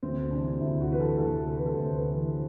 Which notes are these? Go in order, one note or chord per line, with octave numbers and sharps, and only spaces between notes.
D2 C4
C3 E3 D4
D2 E4
F#4
C3 E3 B4
A4
D2 A4
C3 E3 A4
B4
A4
D2 C5
B4
C3 E3